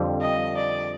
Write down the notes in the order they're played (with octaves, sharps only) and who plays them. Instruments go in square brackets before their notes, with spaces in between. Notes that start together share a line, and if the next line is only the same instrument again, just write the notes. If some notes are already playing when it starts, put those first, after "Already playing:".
Already playing: [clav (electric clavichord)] F2 D3 G3 C4
[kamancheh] D#5
D5